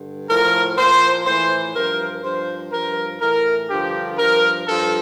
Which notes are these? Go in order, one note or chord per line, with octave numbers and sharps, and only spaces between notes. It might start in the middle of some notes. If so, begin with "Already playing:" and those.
Already playing: G2 D3
A2 F3 A#4
A#2 F3 C5
A2 E3 C5
G2 F3 A#4
G2 F3 C5
G2 F3 A#4
A2 E3 A#4
G2 D3 F3 G4
G2 F3 A#4
G2 F3 A4